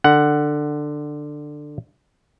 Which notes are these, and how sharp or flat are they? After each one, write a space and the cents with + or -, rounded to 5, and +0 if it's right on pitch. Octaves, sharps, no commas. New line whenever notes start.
D3 +15 F#5 +10